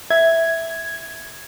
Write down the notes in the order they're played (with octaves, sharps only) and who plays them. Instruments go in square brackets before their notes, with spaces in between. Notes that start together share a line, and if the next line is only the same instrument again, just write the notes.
[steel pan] E5 [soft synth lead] G#6